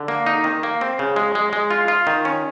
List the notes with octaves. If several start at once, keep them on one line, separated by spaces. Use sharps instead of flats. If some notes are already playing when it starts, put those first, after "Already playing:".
Already playing: D3
A#3
D#4
D#3
A#3
C4
C#3
G#3
G#3
G#3
F4
F4
D#3
C#4